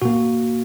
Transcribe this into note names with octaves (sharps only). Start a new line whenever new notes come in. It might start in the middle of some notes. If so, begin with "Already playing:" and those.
A#2 A#3 F#4